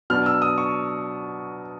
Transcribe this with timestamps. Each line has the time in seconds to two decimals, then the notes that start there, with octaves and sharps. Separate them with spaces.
0.10 B2 F#3 B3 D4 F6
0.26 E6
0.42 D#6
0.58 C#6